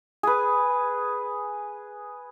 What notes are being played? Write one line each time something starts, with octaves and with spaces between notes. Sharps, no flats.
G#4 B4